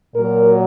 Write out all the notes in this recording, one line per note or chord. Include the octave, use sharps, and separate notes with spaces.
A#2 F#3 A#4